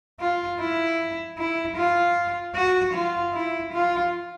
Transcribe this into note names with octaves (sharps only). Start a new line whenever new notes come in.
F4
E4
E4
F4
F#4
F4
E4
F4